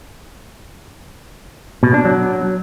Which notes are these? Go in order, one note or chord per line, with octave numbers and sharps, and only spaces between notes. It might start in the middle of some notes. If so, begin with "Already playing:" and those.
B2
D4
F#3